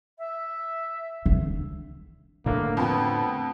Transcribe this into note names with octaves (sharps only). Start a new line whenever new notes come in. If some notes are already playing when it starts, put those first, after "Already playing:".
E5
D3
A2 D3 A3 A#3
F2 B3